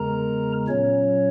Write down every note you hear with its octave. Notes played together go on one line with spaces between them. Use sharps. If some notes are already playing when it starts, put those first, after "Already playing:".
Already playing: E2 C#3 G#3 A#4 A#5
A#2 F#3 C#4 C#5